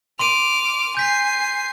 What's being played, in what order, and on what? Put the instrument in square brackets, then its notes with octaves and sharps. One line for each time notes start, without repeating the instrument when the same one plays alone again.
[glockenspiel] C6 D#7 [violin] D6 F6
[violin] G#5 C7 [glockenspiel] G6 B6